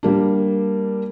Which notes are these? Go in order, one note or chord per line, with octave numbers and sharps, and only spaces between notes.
G3 A#3 D4